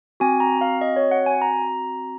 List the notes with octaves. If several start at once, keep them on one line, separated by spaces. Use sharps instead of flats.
C4 F#4 G#5
A#5
F5
D#5
C#5
F#5
G#5
A#5